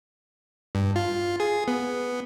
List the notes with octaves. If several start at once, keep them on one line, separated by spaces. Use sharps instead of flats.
G2
F4
G#4
B3